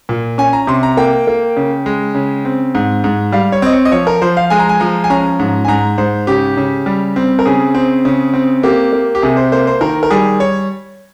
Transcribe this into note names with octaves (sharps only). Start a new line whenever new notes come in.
A#2
C#4 G#5
A#5
C3 C6
A#5
A#3 G5
A#3
C#3
G#3
C#3
C4
G#2
G#2
G3 F5
C#5
C4 D#5
C#5
D#5
F3 C#5
A#4
F3 C5
F5
G#3 G#5
A#5
G#5
F3 A#5
G#5
C#4 A#5
G#2
G#5
G#2 A#5
G#2 C5
C#3 G4
C#3
G3
C4
A#4
C#3 G#4
C4
C#3
C4
A#3 G4
A#3
G4
C3 G#4
C5
A#3 C5
C5
D#3 A#4
A#4
G3 G#4
C#5